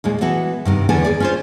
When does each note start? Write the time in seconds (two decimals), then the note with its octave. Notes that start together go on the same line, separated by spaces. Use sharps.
0.04 D#2 A#2 G#3
0.21 E3 B3 F#4 A4
0.65 G2 C3 D#3
0.89 E2 D3 E3 B3 A4 G#5
1.05 D#2 G#4 D5
1.20 C#4 F4 C5